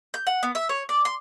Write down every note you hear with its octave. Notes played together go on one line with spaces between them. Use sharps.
G6
F#5
B3
E5
C#5
D5
C6